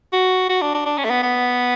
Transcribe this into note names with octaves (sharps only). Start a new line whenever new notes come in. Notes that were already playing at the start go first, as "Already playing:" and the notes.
F#4
F#4
D4
D4
D4
C#4
A3
B3
B3